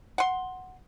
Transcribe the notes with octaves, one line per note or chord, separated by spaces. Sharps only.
F#5 C6